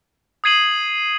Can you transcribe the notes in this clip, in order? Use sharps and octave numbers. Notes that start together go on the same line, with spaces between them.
D#6 G#6 C7 D#7 F#7